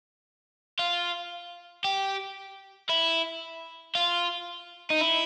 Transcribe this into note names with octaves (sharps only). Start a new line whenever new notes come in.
F4
G4
E4
F4
D#4
E4